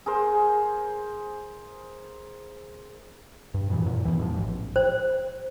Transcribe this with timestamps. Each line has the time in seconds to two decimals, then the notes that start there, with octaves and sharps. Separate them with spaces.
0.06 G#4 A#4 C5
3.54 G2
3.70 G2 A#2 C#3 E3
3.86 F#2 A#2
4.05 E2 E3
4.19 G#2 F3
4.37 A1
4.76 C5